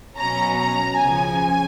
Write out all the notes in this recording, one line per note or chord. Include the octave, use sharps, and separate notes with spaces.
B2 F#3 C#4 A#5
A#5
C#2 C#3 F3 G#5